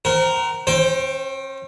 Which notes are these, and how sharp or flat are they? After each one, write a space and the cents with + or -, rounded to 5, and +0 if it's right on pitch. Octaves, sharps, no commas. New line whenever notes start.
C4 +0 A#4 +0 F#5 +45
C#4 -45 C5 +0 G5 +0